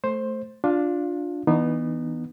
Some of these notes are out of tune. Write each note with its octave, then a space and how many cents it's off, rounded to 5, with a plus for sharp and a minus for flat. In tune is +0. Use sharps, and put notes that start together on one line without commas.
A3 -5 C5 +10
D4 +0 F4 +20 F5 +0
E3 -25 B3 -10 D#4 -35